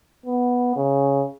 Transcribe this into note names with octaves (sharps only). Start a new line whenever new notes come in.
B3
C#3